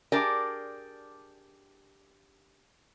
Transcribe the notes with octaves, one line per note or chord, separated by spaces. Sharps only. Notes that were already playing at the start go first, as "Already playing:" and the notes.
D4 G4 G#4 A#4 D5